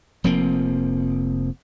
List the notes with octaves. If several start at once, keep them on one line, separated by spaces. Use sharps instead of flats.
F1 F3 A#3 C4